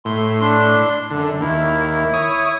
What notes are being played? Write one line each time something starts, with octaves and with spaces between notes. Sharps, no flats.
A2 C6
D4 C6
F#2 D3
D#2 E4
C#5 D#6